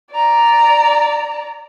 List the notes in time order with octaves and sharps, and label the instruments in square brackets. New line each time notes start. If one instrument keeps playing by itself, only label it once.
[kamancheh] D5 A#5